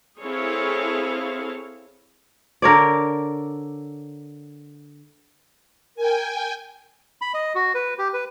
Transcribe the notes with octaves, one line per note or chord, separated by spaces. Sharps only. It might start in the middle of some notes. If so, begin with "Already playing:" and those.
C4 E4 G#4 A4 C#5 F5
D3 A#4 C#5 D5
A#4 G5 G#5
B5
D#5
F#4
B4
G4
B4